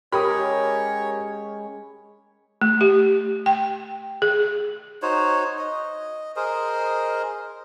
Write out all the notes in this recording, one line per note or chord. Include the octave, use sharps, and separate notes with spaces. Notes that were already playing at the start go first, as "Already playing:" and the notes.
G#3 C#4 G4 A#4 C#5 B5 D#6
A3
G4
G5
G#4
D#4 F#4 C5 C#5
D#5
G#4 A#4 C5 D#5